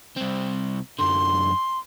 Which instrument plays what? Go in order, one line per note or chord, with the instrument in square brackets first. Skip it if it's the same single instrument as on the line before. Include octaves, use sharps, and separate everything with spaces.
[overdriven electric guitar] C2 C4
[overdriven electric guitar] F#2 D3 [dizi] C6